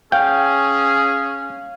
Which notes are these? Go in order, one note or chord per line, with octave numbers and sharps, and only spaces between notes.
C#4 G#4 F5 G5